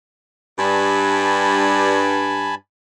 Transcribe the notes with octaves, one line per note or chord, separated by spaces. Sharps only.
G2 G#5 A5 B5